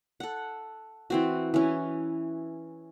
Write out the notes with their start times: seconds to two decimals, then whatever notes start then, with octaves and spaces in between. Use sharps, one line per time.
0.20 A4 F#5
1.10 E3 C4 F#4
1.54 E3 C#4